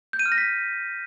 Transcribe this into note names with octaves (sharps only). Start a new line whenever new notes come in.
G6
D#7
F6
A#6
B6